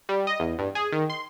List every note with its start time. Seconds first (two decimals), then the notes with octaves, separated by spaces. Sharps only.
0.09 G3
0.27 D#5
0.40 E2
0.59 G2
0.75 G#4
0.92 D#3
1.10 C6